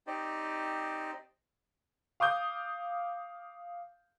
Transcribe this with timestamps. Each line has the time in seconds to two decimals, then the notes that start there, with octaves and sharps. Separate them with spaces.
0.07 C4 D#4 G4 C5 D5 D#5
2.20 F5 D6 D#6 G6